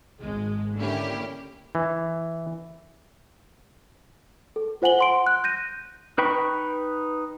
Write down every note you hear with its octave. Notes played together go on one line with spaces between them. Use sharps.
G#1 G#3
D3 A#3 C#4 E4 G4
E3
A4
F4 C5 F#5 G#5 F#7 G7
F#5 C6 D7
F#6
G6 A#6 D#7
D#4 B4 G5 B5 C#6